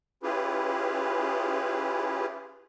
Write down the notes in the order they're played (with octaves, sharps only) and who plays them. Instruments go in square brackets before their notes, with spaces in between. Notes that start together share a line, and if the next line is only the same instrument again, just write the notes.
[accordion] C#4 E4 F4 G4 G#4 B4